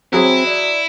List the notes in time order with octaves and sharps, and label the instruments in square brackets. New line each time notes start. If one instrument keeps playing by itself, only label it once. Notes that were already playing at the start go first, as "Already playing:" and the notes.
[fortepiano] F#3 G#4 [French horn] C4 [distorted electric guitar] E4
[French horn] D5